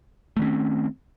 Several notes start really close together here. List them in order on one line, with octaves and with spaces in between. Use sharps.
A3 D#3 C#4 C4